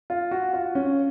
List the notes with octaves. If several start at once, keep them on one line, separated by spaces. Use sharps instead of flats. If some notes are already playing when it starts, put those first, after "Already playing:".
F4
F#4
F4
C#4